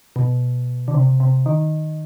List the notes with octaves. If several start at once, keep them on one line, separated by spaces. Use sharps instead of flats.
B2
D3
C3
C3
D#3